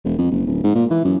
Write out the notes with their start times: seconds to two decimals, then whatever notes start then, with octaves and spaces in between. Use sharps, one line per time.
0.05 E1
0.19 F2
0.31 F#1
0.46 D1
0.64 G#2
0.75 A#2
0.91 E3
1.05 F#2